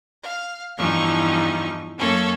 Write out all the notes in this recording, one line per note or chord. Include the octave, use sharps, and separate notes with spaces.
F5
E2 G2 E3 F3 D#4 C#6
F#2 A#3 C#4 A4 C#5